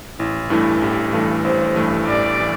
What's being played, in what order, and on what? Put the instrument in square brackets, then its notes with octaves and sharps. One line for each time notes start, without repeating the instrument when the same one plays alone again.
[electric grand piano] A1 [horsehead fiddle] E4
[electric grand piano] G2 E3 A3 [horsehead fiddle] E4
[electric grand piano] A1 [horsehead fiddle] G4
[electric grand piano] G2 E3 A3 [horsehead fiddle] A4
[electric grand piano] A1 [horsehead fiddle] C5
[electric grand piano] G2 E3 A3
[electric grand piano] A1 [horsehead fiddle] D5
[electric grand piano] E3